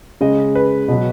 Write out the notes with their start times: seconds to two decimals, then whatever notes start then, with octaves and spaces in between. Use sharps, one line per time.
0.21 C#3 G#3 D#5
0.55 B4
0.88 B2 F#3